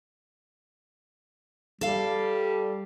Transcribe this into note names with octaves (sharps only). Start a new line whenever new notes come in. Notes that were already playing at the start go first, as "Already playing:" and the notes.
G3 A4 F5